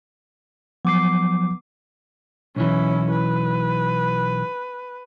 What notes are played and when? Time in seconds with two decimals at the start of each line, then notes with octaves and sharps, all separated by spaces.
0.85 F3 F#3 B3 D6 C7
2.56 B1 E3 C#4 E4
3.11 B4